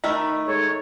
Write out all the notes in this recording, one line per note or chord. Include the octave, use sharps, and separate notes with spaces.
D#3 A3 D#4 B5
G#3 A4 C#5